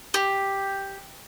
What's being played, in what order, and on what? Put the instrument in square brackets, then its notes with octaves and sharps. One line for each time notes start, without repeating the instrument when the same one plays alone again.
[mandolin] G4